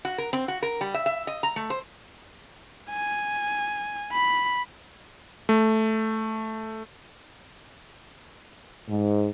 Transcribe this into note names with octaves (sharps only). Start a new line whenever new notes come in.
F#4
A#4
C4
F#4
A#4
G3
E5
E5
D#5
A#5
A3
C5
G#5
B5
A3
G#2